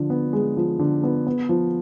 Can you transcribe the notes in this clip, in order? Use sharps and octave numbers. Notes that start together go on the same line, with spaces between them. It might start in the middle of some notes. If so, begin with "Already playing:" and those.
Already playing: D3 F3
B3
G#3
F3
D3
B3
B3
F3